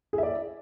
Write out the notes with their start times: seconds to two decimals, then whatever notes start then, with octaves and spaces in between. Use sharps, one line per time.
0.13 G#4
0.18 E5
0.23 D5